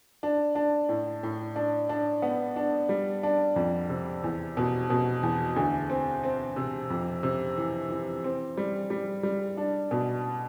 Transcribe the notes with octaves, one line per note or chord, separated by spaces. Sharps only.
D4
D4
A2
A2
D4
D4
B3
D4
G3
D4
F2
C3
E2
B2
B2
E2
D2
C4
C4
C3
F2
C3
E3
E3
C4
G3
G3
G3
D4
B2